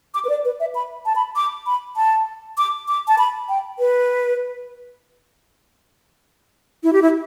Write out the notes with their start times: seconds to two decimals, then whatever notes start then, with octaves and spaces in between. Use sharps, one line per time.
0.14 D6
0.25 B4
0.29 D5
0.45 B4
0.60 E5
0.75 B5
1.06 A5
1.16 B5
1.36 D6
1.66 B5
1.97 A5
2.58 D6
2.88 D6
3.08 A5
3.18 B5
3.49 G5
3.79 B4
6.83 E4
6.93 G4
7.02 E4